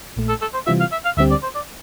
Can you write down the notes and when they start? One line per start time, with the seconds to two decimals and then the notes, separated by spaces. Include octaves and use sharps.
0.16 A#1 A#2 A3
0.29 A4
0.41 A4
0.54 C5
0.67 C3 E3 G3 C4 F4 E5
0.80 F5
0.92 E5
1.05 F5
1.17 D2 D3 G3 C4 G4 E5
1.31 D5
1.43 C5
1.55 D5